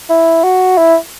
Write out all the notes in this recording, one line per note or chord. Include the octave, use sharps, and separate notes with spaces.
E4
F#4
E4